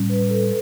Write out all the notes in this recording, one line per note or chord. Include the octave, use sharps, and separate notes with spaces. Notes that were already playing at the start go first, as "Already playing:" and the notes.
Already playing: A2 G3 C#4
B4
A4